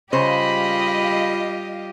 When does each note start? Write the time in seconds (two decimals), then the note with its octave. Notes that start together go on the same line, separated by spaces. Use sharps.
0.13 C#3 G3 F4 G4 C5 D#5 F5 B5